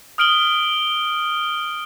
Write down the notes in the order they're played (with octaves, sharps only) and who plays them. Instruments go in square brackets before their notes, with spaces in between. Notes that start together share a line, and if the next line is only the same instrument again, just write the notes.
[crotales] D#6 F6 D7 F#7 G7